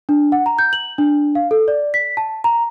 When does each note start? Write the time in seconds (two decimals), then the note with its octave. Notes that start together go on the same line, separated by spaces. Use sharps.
0.09 D4
0.32 F#5
0.46 A#5
0.59 G6
0.73 F#7
0.98 D4
1.35 F5
1.51 A4
1.68 D5
1.94 B6
2.17 A5
2.44 A#5